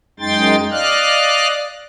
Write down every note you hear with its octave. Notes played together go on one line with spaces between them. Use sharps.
F#2 G#3 D#4 G5 C6 A6
D5 D#5 F5 F6 F#6